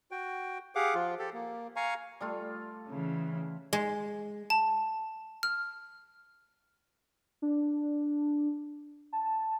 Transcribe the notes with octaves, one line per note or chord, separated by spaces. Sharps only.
F#4 G5
G4 G#4 F5 F#5 D6
F3 F4
G4 A4
A#3
F5 G#5 A#5 C#6
G3 A3 F4
C#3 E3
G#3
A5
F6
D4
A5